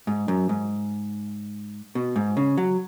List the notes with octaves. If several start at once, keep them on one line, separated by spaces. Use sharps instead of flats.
G#2
F#2
G#2
B2
G#2
C#3
F#3